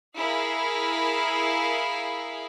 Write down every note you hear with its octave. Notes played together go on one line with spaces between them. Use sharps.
E4 G#4 A#4 F5